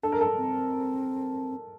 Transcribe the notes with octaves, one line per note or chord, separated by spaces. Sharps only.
D4 A4
A#4
A4
C4